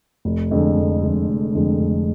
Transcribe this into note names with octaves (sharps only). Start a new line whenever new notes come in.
F1
F2 D3 G#3
F1
F2 D3 G#3
F1
F2 D3 G#3
F1